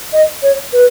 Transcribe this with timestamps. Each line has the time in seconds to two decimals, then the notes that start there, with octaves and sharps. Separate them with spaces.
0.13 D#5
0.43 C#5
0.73 B4